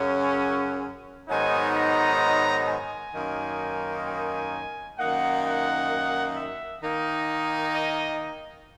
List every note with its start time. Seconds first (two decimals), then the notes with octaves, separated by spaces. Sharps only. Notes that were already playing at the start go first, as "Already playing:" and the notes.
Already playing: F#2 C#3 F#3 C#4
1.29 G#2 D#3 F#3 B3 D#4 G#5
1.76 A#5
2.68 G#5
3.15 F#2 D#3 A#3 D#4
4.07 G#5
4.99 F#2 D#3 A#3 D#4 F#5
5.45 F#5
6.36 E5
6.83 D#3 A#3 D#4
7.74 D#5